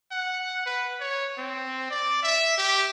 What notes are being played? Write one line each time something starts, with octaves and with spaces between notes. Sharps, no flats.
F#5
B4
C#5
C4
D5
E5
G4